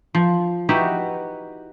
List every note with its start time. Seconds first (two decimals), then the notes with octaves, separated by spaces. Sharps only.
0.14 F3
0.69 D#4 E4 F#4 G4 B4